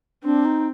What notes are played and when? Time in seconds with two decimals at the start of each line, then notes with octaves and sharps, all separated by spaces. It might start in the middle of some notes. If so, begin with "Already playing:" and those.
0.24 C4 D4
0.45 D#4